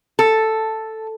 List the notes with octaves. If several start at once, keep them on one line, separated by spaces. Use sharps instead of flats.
A4